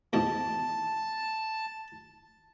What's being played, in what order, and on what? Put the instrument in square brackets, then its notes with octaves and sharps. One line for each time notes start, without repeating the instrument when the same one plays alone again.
[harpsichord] E2 G#2 B2 [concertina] A5